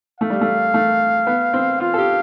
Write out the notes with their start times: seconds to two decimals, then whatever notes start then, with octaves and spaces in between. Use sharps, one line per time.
0.21 A3 F5
0.30 G3
0.41 A3
0.74 A3
1.27 B3
1.54 C4
1.80 F4 F5
1.94 A4
1.98 G4